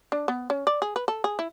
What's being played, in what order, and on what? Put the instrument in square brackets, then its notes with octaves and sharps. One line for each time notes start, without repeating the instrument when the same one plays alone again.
[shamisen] D4
B3
C#4
D5
G#4
B4
A4
G#4
E4